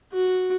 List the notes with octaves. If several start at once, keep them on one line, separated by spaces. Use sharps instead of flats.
F#4